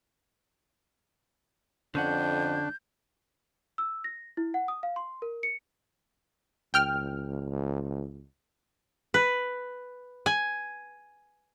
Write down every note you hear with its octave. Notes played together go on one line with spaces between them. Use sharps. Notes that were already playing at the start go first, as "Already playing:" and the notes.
F2 D3 C#4 D4 F#5 G6
E6
A#6
E4
F#5
D#6
F5
C6
A#4
C#7
C#2 G5 F6
B4
G#5